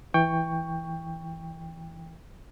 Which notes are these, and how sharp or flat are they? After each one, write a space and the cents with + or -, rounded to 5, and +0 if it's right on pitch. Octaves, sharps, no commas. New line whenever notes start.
E3 +0 G5 +20 C#6 +10